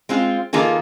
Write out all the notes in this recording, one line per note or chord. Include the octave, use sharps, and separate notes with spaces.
G#3 C4 F4
D#3 A#3 F4 G#4 A4